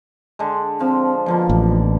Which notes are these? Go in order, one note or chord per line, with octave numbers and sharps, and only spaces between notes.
D3 G#3
F3 C4
B2 D3 F3 A#3
A1